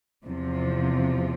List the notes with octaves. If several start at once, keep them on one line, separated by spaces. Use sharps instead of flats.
E2 C3 F3